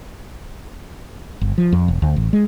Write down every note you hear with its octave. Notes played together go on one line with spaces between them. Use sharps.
G1
F3
F2
E1
D2
A1
G#3